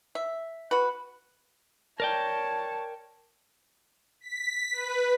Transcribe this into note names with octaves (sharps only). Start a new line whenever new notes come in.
E5
F#4 B4
A#4 C#5 D5 G5 A5
B6
B4